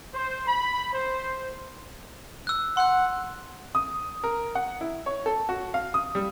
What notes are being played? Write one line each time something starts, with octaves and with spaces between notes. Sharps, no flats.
C5
B5
C5
E6 F#6
F#5 C6 F#6
D#6
A#4
F#5
E4
C#5
A4
F#4
F5
D#6
G3